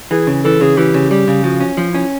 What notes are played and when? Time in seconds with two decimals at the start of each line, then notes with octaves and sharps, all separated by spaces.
0.11 E3 G#4
0.27 C#3
0.44 E3 A4
0.61 C#3 G#4
0.77 E3 G4
0.94 C#3
1.10 G3 G4
1.28 C#3
1.44 F3 F#4
1.60 C#4
1.77 F3
1.88 E4
1.95 C#4